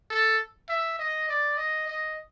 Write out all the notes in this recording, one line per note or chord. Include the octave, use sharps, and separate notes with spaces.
A4
E5
D#5
D5
D#5
D#5